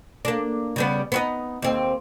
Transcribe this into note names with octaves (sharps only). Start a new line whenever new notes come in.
A#3 D4
C#3 G3 B3
B3 C4 D#4
D#2 C4